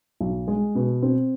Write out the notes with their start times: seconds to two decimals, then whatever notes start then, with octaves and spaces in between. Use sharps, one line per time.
0.21 B1
0.48 G#3
0.75 B2
1.02 C4